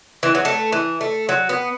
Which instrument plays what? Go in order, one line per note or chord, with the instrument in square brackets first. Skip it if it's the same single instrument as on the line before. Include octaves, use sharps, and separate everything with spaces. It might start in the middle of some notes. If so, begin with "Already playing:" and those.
[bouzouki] E3
F#3
A3
E3
A3
F#3
B3